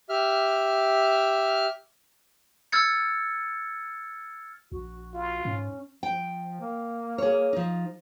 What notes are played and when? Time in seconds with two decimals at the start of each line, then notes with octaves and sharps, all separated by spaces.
0.09 G4 E5 F6
2.72 E6 F6 G#6 A6 C#7
4.72 A#1 F#4
5.14 F4
5.45 G#2 C#4
6.03 F3 G5
6.61 A#3
7.18 G#4 C#5
7.53 F3 D#4